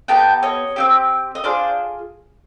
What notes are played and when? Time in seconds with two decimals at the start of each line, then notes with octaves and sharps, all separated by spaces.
0.08 B3 D#4 G4 G5 A5
0.43 C#5 D#5
0.76 C4 D#4 G4
1.35 D#5
1.44 D4 F4 G#4 C5 D5